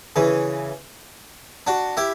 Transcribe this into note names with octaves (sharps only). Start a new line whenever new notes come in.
C#3 E3
D4 F#4
E4 G4